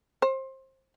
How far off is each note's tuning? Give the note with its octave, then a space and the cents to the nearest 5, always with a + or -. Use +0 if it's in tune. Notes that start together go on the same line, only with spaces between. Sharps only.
C5 +25